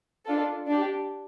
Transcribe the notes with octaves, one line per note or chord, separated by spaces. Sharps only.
D4 F4 A4
D4 G4